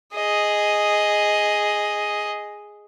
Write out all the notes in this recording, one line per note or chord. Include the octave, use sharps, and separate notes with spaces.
G#4 D#5